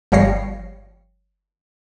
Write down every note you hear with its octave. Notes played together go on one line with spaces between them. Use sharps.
G1 F3 G3 C#5 A#6 C7